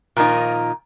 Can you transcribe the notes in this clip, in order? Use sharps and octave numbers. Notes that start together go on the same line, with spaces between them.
A#2 D#3 F3 A#3 D#4